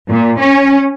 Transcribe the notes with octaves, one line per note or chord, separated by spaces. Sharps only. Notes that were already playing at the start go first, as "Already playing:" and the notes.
A#2
C#4